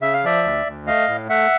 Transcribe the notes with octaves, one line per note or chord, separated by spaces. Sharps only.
C#3 E5
F5
F3 D5 E5
D2
D2
A3 D#5 F5
A2
A3 E5 F#5